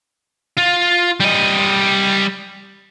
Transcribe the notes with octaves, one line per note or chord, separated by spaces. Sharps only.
F4
G3 D#5